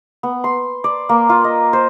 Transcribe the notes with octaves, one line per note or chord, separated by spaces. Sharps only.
B3
C6
D5
A#3
F4
D#5
C5